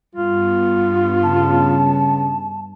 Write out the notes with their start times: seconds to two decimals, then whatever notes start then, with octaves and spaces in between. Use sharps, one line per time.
0.16 G2 B3 F4
1.23 C#3 A5